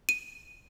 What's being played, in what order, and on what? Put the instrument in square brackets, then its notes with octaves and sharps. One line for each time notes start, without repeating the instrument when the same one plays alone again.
[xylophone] D#7